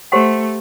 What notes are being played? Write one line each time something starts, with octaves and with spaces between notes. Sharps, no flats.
A3 G4 C5 F#5 C6